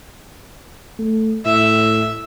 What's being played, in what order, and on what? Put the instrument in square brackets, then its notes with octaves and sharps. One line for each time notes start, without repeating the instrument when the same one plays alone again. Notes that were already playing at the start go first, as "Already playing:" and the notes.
[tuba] A3
[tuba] A2 [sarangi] E5